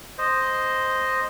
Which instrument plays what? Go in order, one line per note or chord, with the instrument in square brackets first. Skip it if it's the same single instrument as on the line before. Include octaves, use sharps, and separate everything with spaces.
[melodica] C5 D#5